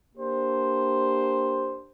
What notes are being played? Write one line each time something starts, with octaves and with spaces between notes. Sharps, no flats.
A#3 D4 G4 C5